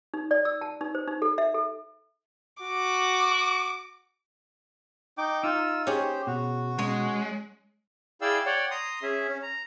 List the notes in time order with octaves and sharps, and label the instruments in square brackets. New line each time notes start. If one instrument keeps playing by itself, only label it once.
[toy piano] D#4
D5
E6
A5
D#4
C5
D#4
A4
E5
A4
[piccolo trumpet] F#4 [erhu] D6
[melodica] D#4 G5 D6
[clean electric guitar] D#4 [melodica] F4 E6
[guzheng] C#4 G#4 [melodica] G4 C5
[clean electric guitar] B2 [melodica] F#4
[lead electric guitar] G#3 [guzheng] C#4 C#5 G#5
[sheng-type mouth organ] E4 G#4 D5 F5 G5 E6
C#5 D5 F#5 G5
A#5 C6 D#6
C#4 G#4 E5
C#4
A#5